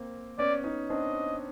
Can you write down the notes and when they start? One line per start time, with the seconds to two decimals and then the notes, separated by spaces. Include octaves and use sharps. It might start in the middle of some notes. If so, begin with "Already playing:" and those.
Already playing: A#3 C4
0.38 B3 C#4 D5
0.63 C#4 D#4
0.90 C4 D4 D#5